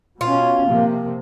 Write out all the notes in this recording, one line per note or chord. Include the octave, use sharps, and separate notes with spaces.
B2 C#4 F4
C3 F3 A#3